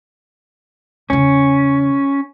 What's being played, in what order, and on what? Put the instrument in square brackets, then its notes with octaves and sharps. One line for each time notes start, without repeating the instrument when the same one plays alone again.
[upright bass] E2 C#3 [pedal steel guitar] C#4